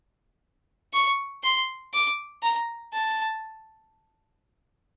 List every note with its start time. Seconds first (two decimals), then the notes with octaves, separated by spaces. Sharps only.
0.93 C#6
1.43 C6
1.94 D6
2.43 A#5
2.93 A5